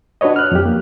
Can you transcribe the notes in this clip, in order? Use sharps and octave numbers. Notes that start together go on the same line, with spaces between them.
D4 F#4 B4 C#5 D#5
F6 F#6
F2 F#3 G4
A#3